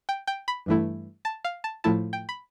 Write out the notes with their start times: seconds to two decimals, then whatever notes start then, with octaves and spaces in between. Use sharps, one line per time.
0.09 G5
0.27 G5
0.48 B5
0.66 G2 E3 A3 E4
1.25 A5
1.45 F5
1.64 A5
1.84 A2 F3 A3 E4 A5
2.13 G5
2.29 B5